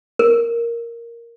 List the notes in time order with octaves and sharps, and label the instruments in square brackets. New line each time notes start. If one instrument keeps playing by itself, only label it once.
[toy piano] A#4